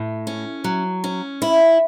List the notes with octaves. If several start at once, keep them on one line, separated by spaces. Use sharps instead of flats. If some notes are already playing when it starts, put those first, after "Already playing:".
Already playing: A2
C#4
F#3
C#4
E4